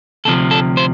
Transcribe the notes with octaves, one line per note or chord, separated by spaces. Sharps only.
D2 C3 F3 A4
A4
C5